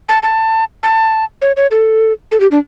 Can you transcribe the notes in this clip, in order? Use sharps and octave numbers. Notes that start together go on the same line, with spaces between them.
A5
A5
A5
C#5
C#5
A4
A4
G4
D4